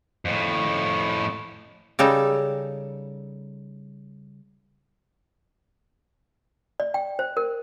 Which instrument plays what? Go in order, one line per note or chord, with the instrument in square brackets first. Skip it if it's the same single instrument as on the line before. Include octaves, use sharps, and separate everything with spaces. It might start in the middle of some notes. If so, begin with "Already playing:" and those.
[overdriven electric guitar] F2 A2
[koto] C#3 G3 D#4 A4
[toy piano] D5
G5
C5
A#4